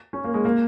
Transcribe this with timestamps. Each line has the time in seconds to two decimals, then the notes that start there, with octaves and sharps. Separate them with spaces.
0.13 C#4
0.24 A#3
0.34 G#3
0.45 A#3